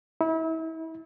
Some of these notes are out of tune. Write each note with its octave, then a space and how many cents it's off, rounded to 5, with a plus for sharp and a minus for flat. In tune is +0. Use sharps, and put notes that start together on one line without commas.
E4 -35